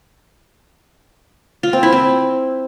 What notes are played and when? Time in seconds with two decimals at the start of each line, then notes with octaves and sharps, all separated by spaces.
1.63 F4
1.73 C4
1.83 E4
1.93 C4